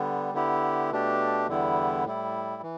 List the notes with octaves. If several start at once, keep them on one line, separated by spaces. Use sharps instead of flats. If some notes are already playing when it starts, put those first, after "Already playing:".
Already playing: D3 G3 B3
D3 B3 E4 G4
B2 A3 D4 G4
E2 D3 G3 B3 E4
A2 G3 E4
E3